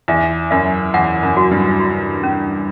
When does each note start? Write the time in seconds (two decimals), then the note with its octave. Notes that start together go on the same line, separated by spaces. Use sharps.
0.08 E2 E5
0.51 F#2 E5
0.94 E2 F#5
1.23 F#2
1.37 F#4
1.51 G2
1.80 F#4
2.23 C#4